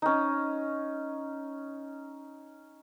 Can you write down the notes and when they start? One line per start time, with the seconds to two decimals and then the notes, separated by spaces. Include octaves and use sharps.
0.02 C#4 D#4